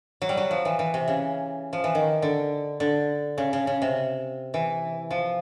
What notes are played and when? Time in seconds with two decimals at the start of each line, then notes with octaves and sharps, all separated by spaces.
0.22 F#3
0.29 G3
0.37 F#3
0.51 F3
0.65 E3
0.79 E3
0.94 C3
1.08 C#3
1.73 F3
1.84 E3
1.95 D#3
2.22 D3
2.80 D3
3.38 C#3
3.53 C#3
3.67 C#3
3.82 C3
4.54 E3
5.11 F3